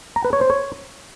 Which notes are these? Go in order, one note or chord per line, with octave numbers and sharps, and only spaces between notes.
A#5
B4
C#5
C5
C#5